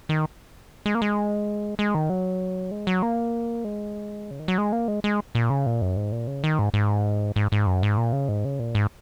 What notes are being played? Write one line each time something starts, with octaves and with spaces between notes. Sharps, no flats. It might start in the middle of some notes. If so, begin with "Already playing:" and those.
D#3
G#3
A#3
G#3
G#3
D#3
F#3
G#3
F#3
A#3
G#3
C#3
D#3
F#3
G#3
A#3
G#3
G#3
A#2
C#3
A#2
F#2
G#2
A#2
C#3
D#3
G#2
G#2
G#2
G#2
F#2
G#2
A#2
C#3
G#2
C#3
A#2
G#2